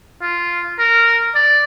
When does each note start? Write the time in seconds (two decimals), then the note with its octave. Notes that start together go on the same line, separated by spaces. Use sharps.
0.22 F4
0.79 A#4
1.35 D5